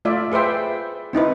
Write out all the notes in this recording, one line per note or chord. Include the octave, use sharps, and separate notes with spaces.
A3 F4 D5 E5
G#4 B4 C5 E5 G5
C4 D#4 E4 B4